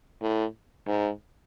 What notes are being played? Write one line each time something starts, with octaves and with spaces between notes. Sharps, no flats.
A2
G#2